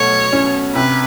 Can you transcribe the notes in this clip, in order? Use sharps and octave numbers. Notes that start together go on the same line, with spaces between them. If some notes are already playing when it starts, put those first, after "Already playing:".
Already playing: B2 F#3 A3 C#5
C#4
C3 B4